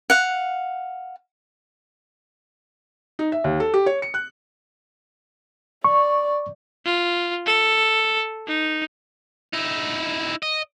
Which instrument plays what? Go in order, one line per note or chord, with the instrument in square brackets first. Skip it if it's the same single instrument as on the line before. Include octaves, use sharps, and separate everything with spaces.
[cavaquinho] F5 F#5
[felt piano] D#4
E5
D#2
A4
G4
C#5
C#7
F#6
[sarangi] D5 [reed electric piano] C#6
[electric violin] F4
A4
D#4
[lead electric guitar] D#4 E4
D#5